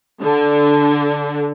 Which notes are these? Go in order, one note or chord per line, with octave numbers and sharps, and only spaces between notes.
D3